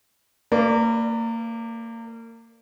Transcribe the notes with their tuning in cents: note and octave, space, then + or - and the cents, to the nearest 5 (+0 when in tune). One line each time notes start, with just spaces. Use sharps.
A#3 -30 B4 +0 D5 +0